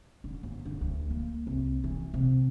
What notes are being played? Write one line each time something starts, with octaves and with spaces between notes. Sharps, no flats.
D3
G1
D3
D2
A#3
C2
E3
C3